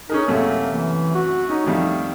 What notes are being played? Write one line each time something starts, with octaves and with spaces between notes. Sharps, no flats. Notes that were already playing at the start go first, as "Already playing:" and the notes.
C#4 D#4 G#4 A#4
F#2 C3 A3 A#3
E3
F#4
C#4 D#4
F2 D#3 G3 A3